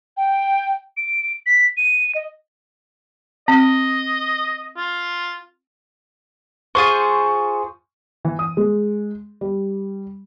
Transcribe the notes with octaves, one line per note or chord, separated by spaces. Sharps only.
G5
D7
B6
D#7
D#5
C4 D#5
F4
F4 G#4 C5 C#6
E3
D#6
G#3
G3